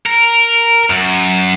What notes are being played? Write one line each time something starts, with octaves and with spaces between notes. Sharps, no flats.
A#4
F#2